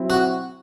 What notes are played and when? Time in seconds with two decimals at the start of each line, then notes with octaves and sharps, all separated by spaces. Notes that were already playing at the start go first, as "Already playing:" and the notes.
Already playing: F#3 C4 E4
0.10 F#4